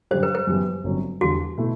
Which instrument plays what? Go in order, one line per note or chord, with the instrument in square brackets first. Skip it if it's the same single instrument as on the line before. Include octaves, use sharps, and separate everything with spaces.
[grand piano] F#2 D3 G3 [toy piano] C5
[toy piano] B4
B4
[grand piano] F#2 E3 G3 B3
G1 F#2 D3 F#3 C4
[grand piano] E2 D3 G3 [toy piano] F#4
[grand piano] B2 A3 E4